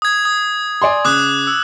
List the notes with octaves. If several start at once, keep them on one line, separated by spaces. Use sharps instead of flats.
D#6 G#6
D#6
D5 G#5 C6
C#3 D6 D#6 F#6
E6